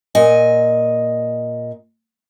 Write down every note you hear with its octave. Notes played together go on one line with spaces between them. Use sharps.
A#2 D#5 G#5